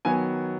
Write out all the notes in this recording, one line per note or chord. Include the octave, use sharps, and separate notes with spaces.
D#3 F#3 B3 G#5